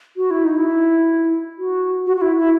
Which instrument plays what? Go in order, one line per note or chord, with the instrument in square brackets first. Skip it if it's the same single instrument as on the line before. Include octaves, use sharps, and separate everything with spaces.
[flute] F#4
E4
D#4
E4
F#4
F#4
F#4
E4
E4